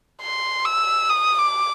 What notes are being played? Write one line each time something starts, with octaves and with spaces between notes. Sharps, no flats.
C6
E6
D#6
D6